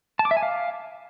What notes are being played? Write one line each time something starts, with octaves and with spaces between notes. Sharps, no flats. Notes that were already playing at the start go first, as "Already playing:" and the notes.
A5
D6
E5
G#5
F5